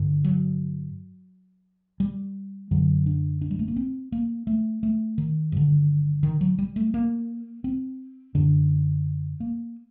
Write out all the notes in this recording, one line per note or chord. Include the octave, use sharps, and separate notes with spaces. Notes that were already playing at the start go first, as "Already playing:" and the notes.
Already playing: G2 D3
F#3
G3
F#2 D3 F#3
D4
D4
G3
A3
A#3
C4
A#3
A3
A3
D#3
G2 D3
D#3
F#3
G3
A3
A#3
C4
F#2 D3 D4
A#3